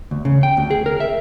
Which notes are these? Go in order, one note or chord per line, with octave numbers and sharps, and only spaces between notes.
D2
C#3
G5
D2
G#4
A#4
E5